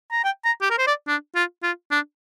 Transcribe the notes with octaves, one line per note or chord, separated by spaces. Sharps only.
A#5
G5
A#5
G4
A#4
C5
D5
D4
F4
F4
D4